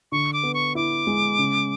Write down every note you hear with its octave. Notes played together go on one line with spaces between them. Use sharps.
D3 C#6
D6
B3
C#6
E4 D6
G#3
C#3